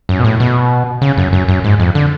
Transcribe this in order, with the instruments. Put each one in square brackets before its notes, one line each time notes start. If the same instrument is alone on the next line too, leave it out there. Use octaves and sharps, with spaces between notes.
[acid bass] F#2
B2
A2
B2
C#3
F#2
F#2
F#2
G#2
F2
D3